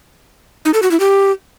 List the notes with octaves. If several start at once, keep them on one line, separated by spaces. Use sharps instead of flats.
D#4
A4
F#4
E4
G4